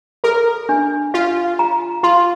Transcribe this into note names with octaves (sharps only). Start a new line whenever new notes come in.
A4 A#4
D4
F4 F5
A#5
F4 C6